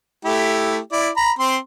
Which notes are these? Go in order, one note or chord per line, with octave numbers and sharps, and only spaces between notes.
A3 E4 G4
E4 D5
A#5 B5
C4 C6